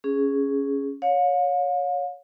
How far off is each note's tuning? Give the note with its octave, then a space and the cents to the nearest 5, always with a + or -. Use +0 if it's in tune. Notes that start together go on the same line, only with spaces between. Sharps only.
C#4 +0 G#4 +0
C#5 +10 F5 +40